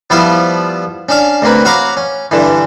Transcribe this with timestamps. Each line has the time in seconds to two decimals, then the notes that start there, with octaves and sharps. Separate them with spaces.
0.10 F3 G3 B3 E4 F4
1.09 C#4 D4 F5
1.42 D2 C3 A#3 B4
1.65 F#4 C#5 F5 A#5 B5 D6
1.97 C#4
2.31 G2 D3 E3